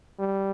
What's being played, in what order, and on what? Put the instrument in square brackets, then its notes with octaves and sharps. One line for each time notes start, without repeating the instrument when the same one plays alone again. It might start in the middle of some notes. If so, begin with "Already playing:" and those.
[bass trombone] G3